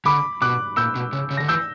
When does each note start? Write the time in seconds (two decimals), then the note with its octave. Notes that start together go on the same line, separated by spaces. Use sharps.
0.05 D3 B5 D6
0.42 B2 D6 F#6
0.77 A#2 E6 G6
0.95 B2
1.13 C#3
1.31 C#3
1.37 D3 A#6
1.48 E3 E6 G6